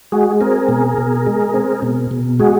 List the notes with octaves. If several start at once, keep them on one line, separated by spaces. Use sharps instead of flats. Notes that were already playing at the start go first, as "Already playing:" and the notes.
G#3 F#4 G#4
C4 G#4 A#4
B2
B2
G#3
C4
B2
B2
G#3 F#4 G#4